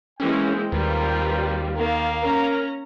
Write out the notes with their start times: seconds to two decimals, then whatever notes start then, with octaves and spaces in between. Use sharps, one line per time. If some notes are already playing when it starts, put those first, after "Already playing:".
0.20 E3 G#3 A#3 C4 C#4 G5
0.72 D#2 G3 F4 A#4 B4
1.77 D#3 A#3 F5
2.22 C#4 A#4 A#5